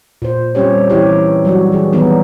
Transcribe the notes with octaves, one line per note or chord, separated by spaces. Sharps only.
A#2 C5
G3 C4 C#4 G4 C#5
E3 C4 D#4 E4 G4 C#5
F#3 G3 F#4
E3 G#4
D#3 E3 F#3 G3 B3 D#4